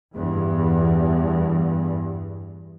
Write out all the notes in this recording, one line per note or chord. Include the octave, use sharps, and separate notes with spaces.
E2 G2